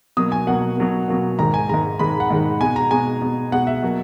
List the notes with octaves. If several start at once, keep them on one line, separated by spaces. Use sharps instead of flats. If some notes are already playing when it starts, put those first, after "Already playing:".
B2 F#3 A#3 D#6
G#5
B2 F#3 A#3 F#5
B2 F#3 A#3
B2 F#3 A#3
G#2 D#3 G#3 A#5
G#5
G#2 D#3 G#3 A#5
G#2 D#3 G#3 B5
F#5
G#2 D#3 G#3
B2 G#3 G#5
A#5
B2 G#3 G#5
B2 G#3
B2 G#3 F#5
E5
B2 F#3 A#3